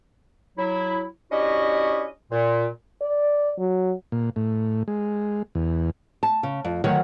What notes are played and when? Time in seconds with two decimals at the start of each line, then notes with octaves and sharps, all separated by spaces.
0.57 F#3 E4
1.32 C#4 D4 E4 F#4 G4 D#5
2.32 A#2
3.01 D5
3.59 F#3
4.12 A#2
4.36 A2
4.88 G#3
5.55 E2
6.23 A5
6.43 C#3
6.64 F2
6.84 D2 D#3 F#3 C#5 F#5